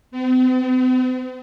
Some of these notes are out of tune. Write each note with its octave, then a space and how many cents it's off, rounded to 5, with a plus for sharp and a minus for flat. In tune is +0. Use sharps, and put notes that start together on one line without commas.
C4 -45